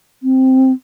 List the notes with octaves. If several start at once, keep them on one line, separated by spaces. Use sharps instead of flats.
C4